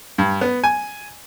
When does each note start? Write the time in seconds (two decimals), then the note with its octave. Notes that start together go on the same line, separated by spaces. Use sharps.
0.18 G2
0.41 B3
0.64 G#5